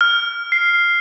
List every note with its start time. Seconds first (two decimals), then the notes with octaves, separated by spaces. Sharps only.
0.01 F6
0.52 C7